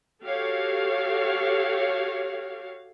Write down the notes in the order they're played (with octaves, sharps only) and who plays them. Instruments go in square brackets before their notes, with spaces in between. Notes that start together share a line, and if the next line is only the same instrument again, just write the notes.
[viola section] F#4 G4 A4 C#5 F5